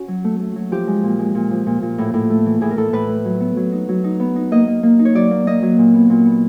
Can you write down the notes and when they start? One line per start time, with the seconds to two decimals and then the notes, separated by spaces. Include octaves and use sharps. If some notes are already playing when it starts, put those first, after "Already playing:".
Already playing: C#4 F#4
0.08 F#3
0.24 A3
0.40 A3
0.56 F#3
0.71 F3 G4
0.87 G#3
1.04 A#2
1.19 G#3
1.35 A#2
1.51 F3
1.67 A#2
1.82 A#2
1.98 A2
2.14 A2
2.30 A3
2.46 E3
2.61 A2 G#4
2.71 A#4
2.77 A2 A4
2.93 A2 B4
3.09 A3
3.25 F#3
3.41 B3
3.57 F#3
3.72 D#4
3.89 F#3
4.04 D#4
4.20 B3
4.36 D#4
4.51 A#3 D#5
4.67 A#3
4.83 A#3
4.99 D#4
5.05 C#5
5.15 F#3 D5
5.31 A#3
5.47 A#3 D#5
5.62 F#3
5.78 A#2
5.94 B3
6.10 A#2
6.25 B3